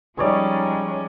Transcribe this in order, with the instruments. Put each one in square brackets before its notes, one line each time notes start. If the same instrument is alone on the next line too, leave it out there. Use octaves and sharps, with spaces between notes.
[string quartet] F3 G#3 C#4 [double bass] G3 D#4 [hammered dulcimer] G#4 C#5 D5